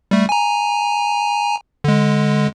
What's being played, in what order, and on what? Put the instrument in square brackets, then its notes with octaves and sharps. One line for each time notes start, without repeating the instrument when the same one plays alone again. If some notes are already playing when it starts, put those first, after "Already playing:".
[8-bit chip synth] G3 A3
G#5 A#5
D3 G#3